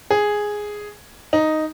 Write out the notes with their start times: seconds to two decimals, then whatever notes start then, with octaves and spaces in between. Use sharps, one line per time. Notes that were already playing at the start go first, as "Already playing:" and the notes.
0.10 G#4
1.33 D#4